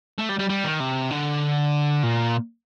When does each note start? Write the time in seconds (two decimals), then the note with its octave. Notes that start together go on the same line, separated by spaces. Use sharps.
0.18 A3
0.29 G3
0.39 G3
0.49 G3
0.64 D#3
0.80 C3
1.11 D3
2.03 A#2